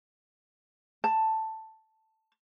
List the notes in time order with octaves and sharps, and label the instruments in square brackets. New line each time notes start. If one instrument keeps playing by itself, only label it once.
[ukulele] A5